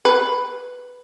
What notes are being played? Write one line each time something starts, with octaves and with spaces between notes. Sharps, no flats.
B4